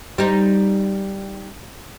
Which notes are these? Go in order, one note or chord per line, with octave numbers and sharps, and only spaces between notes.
G3 D#4